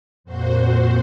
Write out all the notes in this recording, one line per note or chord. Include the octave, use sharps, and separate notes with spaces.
F2 A#2 F#4 C5